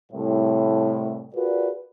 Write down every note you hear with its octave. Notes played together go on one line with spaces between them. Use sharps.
C2 A2
F4 F#4 G#4 A#4 B4 D5